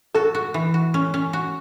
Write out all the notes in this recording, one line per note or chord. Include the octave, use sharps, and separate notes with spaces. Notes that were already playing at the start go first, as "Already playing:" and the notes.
F#4 A4
F#4
E3
F#4
C#4
C#4
F#4